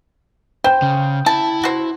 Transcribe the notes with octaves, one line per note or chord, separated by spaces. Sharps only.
C5 G5
C#3
E4 A5
F#4 C5